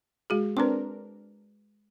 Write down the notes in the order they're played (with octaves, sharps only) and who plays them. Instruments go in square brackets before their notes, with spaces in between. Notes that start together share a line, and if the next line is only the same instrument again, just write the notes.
[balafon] G#3 F#4 G#4
[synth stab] C4 D4 A#4 [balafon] B4 C6